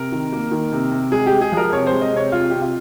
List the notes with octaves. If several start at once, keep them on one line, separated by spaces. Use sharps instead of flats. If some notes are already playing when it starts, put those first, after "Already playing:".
Already playing: C3 A#4
D#3
A#3
D#3
C3
C3
G#3 G#4
G4
G#3
G#4
F3
A#4
C3 C#5
C5
G#3
D#5
C3 C#5
C3 F4
C3 G4
F4